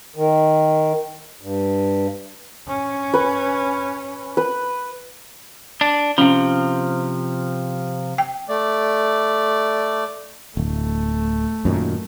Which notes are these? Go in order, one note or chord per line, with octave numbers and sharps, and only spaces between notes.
D#3
G2
C#4
B4
B4
D4
C3 F3 C#4
G5
A3 D5
D1 A3
F#2 A#2 D#3